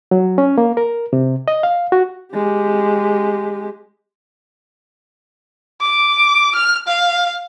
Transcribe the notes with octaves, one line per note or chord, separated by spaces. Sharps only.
F#3
C#4
A#3
A#4
C3
D#5
F5
F#4
G#3 G4
D6
F6
F5